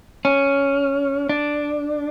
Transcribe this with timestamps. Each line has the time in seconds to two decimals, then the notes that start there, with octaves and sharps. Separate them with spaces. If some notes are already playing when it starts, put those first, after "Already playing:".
0.25 C#4
1.29 D4